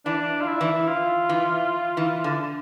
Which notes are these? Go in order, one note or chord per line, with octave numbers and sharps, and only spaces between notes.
E3 D4
F4
E4
E3
F4
E3
E3
D3